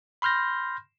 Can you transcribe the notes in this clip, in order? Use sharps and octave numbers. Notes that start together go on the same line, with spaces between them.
B5 C6 F6 G6 A#6